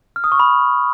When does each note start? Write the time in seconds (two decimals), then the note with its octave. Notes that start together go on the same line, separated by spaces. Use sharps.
0.16 F6
0.24 D#6
0.32 C#6
0.40 B5